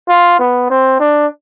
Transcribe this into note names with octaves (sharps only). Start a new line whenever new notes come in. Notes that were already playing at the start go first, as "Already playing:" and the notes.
F4
B3
C4
D4